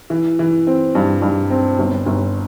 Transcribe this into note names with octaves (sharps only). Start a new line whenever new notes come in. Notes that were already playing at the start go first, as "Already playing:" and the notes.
E3
E3
C4
G2
G2
C4
G1
G1